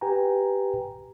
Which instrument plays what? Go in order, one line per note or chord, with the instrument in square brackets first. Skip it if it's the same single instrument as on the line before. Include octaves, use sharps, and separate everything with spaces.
[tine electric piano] G4 B4 G5 G#5 A#5